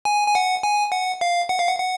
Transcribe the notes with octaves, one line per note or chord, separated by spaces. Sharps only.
G#5
G#5
F#5
G#5
F#5
F5
F#5
F5
F#5
F#5